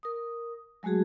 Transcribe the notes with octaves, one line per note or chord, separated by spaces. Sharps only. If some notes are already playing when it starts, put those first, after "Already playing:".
A#4 D#6
F#3 G#3 A3 F#4 G#4